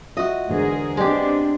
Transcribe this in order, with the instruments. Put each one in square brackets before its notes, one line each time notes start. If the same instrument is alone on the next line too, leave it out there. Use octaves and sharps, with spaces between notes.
[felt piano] F4 E5 [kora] F#4 D#5
[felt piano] E2 D3 [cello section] G#2 G#4 A#4
[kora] G#3 G4 [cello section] B3 C4 D4 [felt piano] D5 D#5 G5